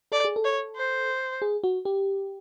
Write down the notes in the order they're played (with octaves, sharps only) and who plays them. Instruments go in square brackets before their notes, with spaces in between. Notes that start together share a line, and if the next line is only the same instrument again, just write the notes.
[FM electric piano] A4 [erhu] D5
[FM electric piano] G#4
A4
[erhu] C#5
C5
[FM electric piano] G#4
F#4
G4